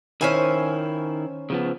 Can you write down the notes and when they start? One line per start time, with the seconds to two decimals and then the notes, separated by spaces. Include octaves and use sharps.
0.21 D#3 C#4 E4 C5 G#5
1.50 C#3 F3 B3